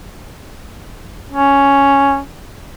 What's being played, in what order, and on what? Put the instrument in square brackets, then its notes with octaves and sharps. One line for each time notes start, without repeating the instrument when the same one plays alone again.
[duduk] C#4